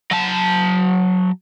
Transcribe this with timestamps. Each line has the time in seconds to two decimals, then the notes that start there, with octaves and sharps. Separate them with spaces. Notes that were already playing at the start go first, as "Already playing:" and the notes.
0.11 F#3 A5